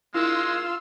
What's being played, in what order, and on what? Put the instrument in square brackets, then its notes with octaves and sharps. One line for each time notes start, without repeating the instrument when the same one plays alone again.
[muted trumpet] G#3 [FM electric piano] D4 E4 A#4 [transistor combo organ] F4 [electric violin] C6 E6